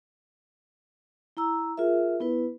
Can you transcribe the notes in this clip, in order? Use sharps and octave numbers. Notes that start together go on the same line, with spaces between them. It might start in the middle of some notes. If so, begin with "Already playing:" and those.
E4 A#5 E6
F4 G#4 A#4 E5
B3 E4 B4